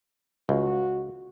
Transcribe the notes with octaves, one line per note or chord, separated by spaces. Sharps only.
C#2 F#4